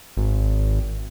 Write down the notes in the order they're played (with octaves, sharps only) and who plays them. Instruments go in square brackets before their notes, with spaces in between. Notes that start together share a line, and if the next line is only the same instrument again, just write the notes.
[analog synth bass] G#1